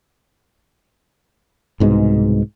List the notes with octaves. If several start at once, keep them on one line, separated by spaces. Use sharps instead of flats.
C2 G#2 B2 G#3